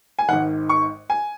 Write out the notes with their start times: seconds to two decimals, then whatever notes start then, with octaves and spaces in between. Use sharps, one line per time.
0.19 G#5
0.28 G#1 G#2 D#3 F#5
0.69 C#6
1.10 G#5